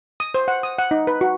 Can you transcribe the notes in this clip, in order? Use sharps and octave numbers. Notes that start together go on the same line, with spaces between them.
D#6
C5
F#5
D#6
F#5
D#4
B4
F#4